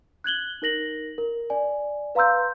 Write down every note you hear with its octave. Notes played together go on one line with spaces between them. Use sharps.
F#6 G#6 F#7 G7
D#4 A#4 A#6 F#7
A#4
D5 G#5
B4 F5 A#5 C6 E6 G6